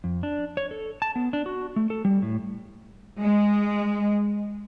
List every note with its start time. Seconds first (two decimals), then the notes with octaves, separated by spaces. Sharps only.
0.04 F2
0.23 D4
0.57 C#5
0.71 A4
1.02 A5
1.16 B3
1.33 D4
1.46 F#4
1.76 A3
1.90 A4
2.05 G3
2.22 A2
3.20 G#3